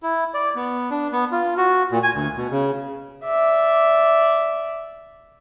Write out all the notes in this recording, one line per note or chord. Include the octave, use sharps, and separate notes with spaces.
E4
D5
B3
D4
B3
F4
F#4
A#2
G#5
D2
B2
C#3
D5 E5